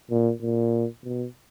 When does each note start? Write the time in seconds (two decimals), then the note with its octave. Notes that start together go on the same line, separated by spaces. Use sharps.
0.11 A#2
0.42 A#2
1.04 B2